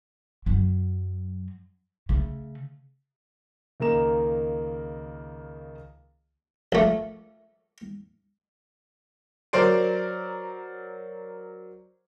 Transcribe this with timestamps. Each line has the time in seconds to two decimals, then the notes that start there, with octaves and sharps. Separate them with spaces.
0.46 F#2 F#3
2.09 C#3 A3
3.80 C#2 D#3 A#3 A#5 E7
6.72 A#1 A3
9.53 F#3 A#4 C5 D5 C6 D7